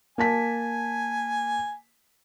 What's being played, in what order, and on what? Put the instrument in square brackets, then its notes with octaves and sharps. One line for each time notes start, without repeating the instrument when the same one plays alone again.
[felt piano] A#3 A5 B6 [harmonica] G#5